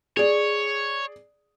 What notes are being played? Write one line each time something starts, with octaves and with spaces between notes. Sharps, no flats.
G#4 C#5 D5